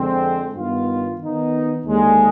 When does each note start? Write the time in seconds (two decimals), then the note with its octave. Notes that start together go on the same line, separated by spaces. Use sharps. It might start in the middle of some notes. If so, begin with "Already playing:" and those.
Already playing: F2 D3 G#3 C4
0.54 G2 D#3 B3 F4
1.20 D#3 B3 D#4
1.86 D#2 D3 G#3